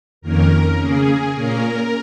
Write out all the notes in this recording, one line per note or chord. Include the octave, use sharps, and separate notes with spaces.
F2 D#3 A#3 C#4 A#4
C#3 A#3 C#4 G#4
A#2 A#3 C#4 A#4